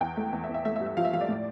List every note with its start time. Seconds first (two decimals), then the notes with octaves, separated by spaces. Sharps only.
0.01 E2 G5
0.17 A3
0.33 E2
0.44 E5
0.49 E2
0.54 E5
0.65 A3 E5
0.76 E5
0.80 G2
0.86 E5
0.97 F3 F5
1.05 E5
1.13 F3 F5
1.21 D5
1.29 A2